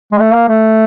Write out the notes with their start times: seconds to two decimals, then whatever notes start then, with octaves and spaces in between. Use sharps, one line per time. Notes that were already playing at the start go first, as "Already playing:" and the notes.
0.12 G#3
0.19 A3
0.34 A#3
0.48 A3